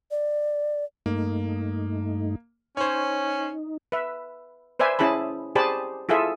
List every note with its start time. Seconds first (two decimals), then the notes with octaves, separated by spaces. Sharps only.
0.11 D5
1.06 G2 A3 A#3 D#4
2.77 C#4 D#4 C5 C#5
3.92 B4 E5
4.79 B4 C5 D5 E5 G#5
4.99 C#4 E4 G#4 A5 B5
5.55 G4 G#4 C5 D5 A5 B5
6.09 E4 F4 G#4 A4 E5